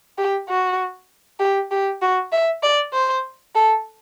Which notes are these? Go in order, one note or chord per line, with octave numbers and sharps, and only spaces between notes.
G4
F#4
G4
G4
F#4
E5
D5
C5
A4